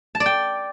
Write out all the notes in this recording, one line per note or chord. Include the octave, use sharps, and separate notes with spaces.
A5
D5
G5